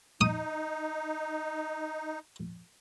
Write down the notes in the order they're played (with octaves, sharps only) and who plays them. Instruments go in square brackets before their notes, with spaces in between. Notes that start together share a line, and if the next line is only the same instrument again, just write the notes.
[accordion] D#4 [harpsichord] D#6